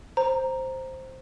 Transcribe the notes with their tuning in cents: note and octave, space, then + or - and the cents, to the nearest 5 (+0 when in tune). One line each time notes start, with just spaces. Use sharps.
C5 +5 A#5 +0